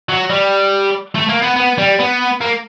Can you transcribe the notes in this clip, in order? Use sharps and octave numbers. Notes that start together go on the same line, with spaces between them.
F#3
G3
A3
A#3
B3
B3
G3
B3
A#3